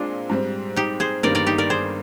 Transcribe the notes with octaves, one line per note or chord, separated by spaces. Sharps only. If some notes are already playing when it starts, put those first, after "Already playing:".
Already playing: A#2 G#3 C4 D4 F4
G#2 G3 C4
D#4 G4
G#4 C5
G1 G2 D#3 G3 A#3 A#4 D5
A#4 D5
D#4 G4
A#4 D5
G#4 C5